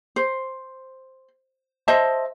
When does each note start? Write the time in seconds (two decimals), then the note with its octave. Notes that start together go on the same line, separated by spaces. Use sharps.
0.16 C5
1.88 C5 D#5 E5 A5